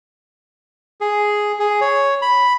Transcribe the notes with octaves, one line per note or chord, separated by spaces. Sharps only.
G#4
G#4
C#5
B5